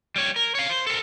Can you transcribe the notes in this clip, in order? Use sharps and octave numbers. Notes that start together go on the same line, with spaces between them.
G3 C#5
A#4
C#5 F5
C5
A4 A#4